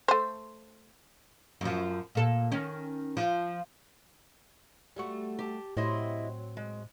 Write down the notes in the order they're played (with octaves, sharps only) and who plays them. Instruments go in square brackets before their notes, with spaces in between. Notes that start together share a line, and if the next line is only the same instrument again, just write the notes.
[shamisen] A3 C5
[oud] F#2 F3
A#2 A4
D#3 C#4
F3
G3 A3 F#4
[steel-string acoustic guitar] G4 A5
[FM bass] A2 [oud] F#3 C4 [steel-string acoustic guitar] E4 D#5
[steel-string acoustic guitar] G#3